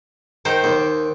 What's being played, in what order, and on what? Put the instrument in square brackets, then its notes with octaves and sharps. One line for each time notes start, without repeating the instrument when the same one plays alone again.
[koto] D#3 D#4 C5
[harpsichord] D#2